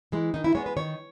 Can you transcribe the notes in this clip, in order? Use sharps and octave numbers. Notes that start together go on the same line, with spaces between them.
E3 G#3
D#3 D#4
E4
G#3 B3 C#5
B4
D#3 C#5